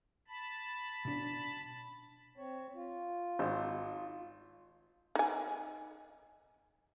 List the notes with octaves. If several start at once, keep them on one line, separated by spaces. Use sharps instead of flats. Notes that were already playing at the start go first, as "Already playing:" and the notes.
A5 B5
B2 D4
C4 C#5
F4
G#1
D#4 G#5